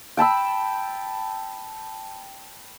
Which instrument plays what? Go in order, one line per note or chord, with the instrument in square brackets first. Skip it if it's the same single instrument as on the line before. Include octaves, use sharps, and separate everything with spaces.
[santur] G5 A5 B5 E6